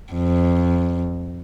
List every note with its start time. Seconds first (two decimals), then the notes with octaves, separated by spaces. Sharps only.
0.13 F2